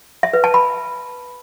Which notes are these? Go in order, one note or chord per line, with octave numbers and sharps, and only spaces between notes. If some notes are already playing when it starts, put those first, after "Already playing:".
E5
B4
A5
B5